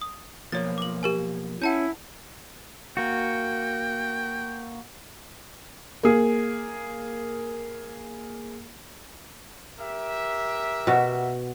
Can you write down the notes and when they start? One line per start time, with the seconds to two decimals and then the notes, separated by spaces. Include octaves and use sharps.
0.02 D#6
0.52 B1 F3 A#3 C#5 A6
0.78 D6 F#7
1.03 G4 A#4 G#5
1.62 C#4 E4 F#5 A5 G6
2.97 A#3 F#4 G5
6.03 A#3 G#4
9.79 G4 A#4 E5
10.87 B2 F#4